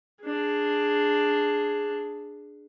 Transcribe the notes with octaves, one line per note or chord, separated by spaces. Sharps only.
D4 G#4